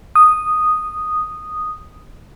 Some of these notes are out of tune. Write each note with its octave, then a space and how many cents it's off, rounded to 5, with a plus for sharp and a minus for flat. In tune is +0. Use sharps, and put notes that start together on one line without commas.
D#6 -5